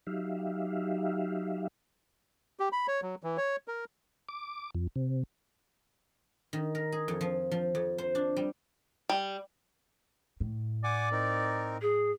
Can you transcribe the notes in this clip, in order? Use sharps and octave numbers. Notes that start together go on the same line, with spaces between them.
F#3 D#4 G4 E5 F5
G4
B5
C#5
F#3
E3
C#5
A#4
D6
F2
C3
D#3
A#4
G#4
F2
F3
F3
F2
C5
D4
G3
G3
A2
D5 F#5 G#5 D6
C4 D#4 A#4
G#4